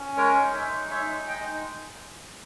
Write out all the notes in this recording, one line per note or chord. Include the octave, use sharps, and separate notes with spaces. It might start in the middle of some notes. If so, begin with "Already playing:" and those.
Already playing: C#4
G#3 A#4 C#5
D#4
C#5 E5
G#3
D#4 C#5 E5
G#3
D#5 G5
D#4